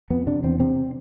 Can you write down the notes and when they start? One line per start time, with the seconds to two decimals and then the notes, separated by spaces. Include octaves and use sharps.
0.10 F2 B3
0.27 C3 D4
0.44 E2 C4
0.60 C3 C4